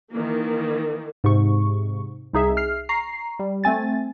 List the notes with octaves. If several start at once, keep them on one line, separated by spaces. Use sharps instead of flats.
D#3 E3 A#3
G#2 C3 C#6
C2 D#4 G#4 E5
F6 C7
A#5 C#6 C7
G3
A3 C4 G#5 A6